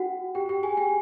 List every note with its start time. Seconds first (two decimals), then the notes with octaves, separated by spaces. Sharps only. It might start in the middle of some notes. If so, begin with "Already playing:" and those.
Already playing: F#4 F#5 G5
0.35 G4 G5
0.49 G4 G5
0.63 G#4 G#5
0.77 G4 G5